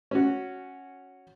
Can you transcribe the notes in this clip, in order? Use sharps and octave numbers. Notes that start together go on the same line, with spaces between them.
C#4 F#4